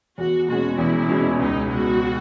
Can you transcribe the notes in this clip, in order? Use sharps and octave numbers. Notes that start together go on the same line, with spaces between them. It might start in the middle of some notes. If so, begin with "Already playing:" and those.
E2 F#4
B2 G#3 C#4 F#4
E2 E4
B2 G#3 C#4
C#2 D#4
B2 G#3 F#4